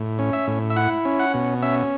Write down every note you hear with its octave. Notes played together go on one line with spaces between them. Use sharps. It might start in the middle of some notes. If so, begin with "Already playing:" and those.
Already playing: A2
C#4
E5
A2
E5
E4 F#5
C#4
F#5
B2
C#4 E5